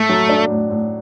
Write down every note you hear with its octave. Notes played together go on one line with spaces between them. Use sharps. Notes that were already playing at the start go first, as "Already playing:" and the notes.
Already playing: A2 A3
F#3
D4
A2
A2